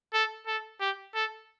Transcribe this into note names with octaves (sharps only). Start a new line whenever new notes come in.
A4
A4
G4
A4